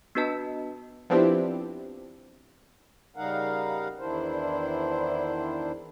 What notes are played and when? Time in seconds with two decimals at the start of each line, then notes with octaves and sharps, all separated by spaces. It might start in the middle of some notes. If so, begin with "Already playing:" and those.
0.15 B3 D4 F#4 B4 D#5 A5
1.10 F3 B3 C4 D4 E4 G4
3.16 C#3 G3 D#4 A#4 F5 F#5
3.99 E2 D#3 D4 E4 C5